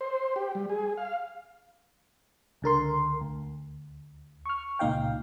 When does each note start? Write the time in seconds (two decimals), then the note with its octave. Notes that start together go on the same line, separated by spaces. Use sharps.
0.01 C5
0.36 G4
0.55 G3
0.69 G#4
0.97 F5
2.62 C#2 D3 A#4 C6
3.21 D2
4.46 C#6 F6
4.79 C#2 A#2 D#4 F5 G5